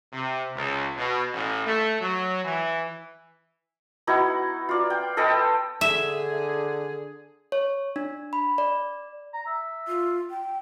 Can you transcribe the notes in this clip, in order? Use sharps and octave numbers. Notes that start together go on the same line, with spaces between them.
C3
C#2
B2
A1
A3
F#3
E3
B3 D#4 E4 F#4
F4 D5
G5
A4 B4 D#5 G5
D3 G#4 E5
C#5
D4
B5
D5
A#5
E5
F4
G5